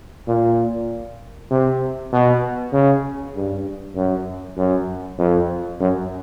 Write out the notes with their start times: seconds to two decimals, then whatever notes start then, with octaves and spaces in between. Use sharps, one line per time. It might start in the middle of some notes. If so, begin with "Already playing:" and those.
0.28 A#2
1.51 C3
2.12 B2
2.73 C#3
3.35 G2
3.96 F#2
4.58 F#2
5.19 F2
5.81 F#2